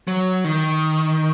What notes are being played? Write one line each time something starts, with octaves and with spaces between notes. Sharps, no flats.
F#3
D#3